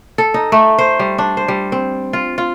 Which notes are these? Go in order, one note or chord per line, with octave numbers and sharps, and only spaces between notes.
A4
D#4
A3
C5
G3
D4
C5
G3
C4
F4
F4